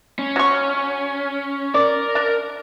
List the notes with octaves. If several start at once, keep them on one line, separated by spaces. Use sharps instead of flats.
C#4
F#3 C#6
A#4 D5
D4